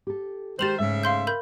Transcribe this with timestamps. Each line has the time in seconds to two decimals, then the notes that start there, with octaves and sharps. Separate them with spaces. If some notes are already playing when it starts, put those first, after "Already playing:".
0.07 G4 A4
0.59 D#3 G#3 G4 C5 A6 F7 F#7
0.79 G#2 C#3 A3 E5
1.03 F5 C6 G6
1.27 A#4 B5 G6